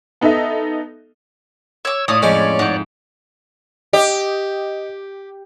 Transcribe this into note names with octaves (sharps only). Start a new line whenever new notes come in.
B3 D#4 A4 D#5 E5
C#5 D6 E6
A2 A3 F4 C#5 D5 D#6
F2 G#3 C#4 D6
G#2 F#5 G5
G4 D#5